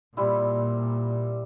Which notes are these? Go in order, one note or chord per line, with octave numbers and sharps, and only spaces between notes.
A#2 G3 C4 E4